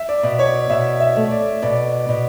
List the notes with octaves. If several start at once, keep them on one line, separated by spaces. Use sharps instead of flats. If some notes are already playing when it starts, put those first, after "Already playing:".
Already playing: E5
D5
B2
C#5
B2 E5
E5
A3
D5
B2 D5
B2